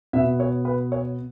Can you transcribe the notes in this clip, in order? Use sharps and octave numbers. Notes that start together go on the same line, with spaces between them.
B2 B3 E5
C#5
B4
C#5